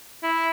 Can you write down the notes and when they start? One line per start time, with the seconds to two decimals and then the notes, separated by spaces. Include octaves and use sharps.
0.23 E4